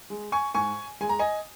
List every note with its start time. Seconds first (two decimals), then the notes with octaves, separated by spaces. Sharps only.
0.10 G#3
0.32 G#5 C#6
0.55 G#2 G#5 C#6
1.01 G#3 G#5
1.09 A#5
1.19 D#5 G#5